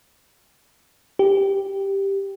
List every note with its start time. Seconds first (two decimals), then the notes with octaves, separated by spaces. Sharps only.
1.19 G4